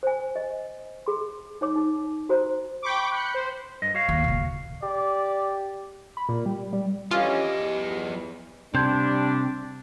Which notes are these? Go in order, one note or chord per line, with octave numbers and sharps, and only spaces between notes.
C5 G#5
D#5
G#4 C6
D#4 C#5 D6
D#4
F#4 C5 A#5
G5 B5 C#6 D6
B5 F#6 G6 B6 C#7
C5
G2 D#5
F#4 C#5 F5
D#2
D#1 C#3
G4 D5
B5
A#2
G3
G3
D3 E3 F3 C#4 F4 G4 D#5
E2
C3 G3 D4 C6 G6 G#6